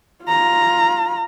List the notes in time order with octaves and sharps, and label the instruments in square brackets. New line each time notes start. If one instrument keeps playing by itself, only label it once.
[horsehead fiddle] F4 A#5